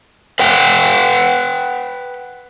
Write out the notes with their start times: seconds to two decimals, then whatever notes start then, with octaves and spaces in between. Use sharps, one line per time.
0.39 B4 F#5 G5